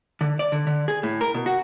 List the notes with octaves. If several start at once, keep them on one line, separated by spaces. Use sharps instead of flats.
D3
D5
D3
D3
G#4
A2
A#4
B2
F#4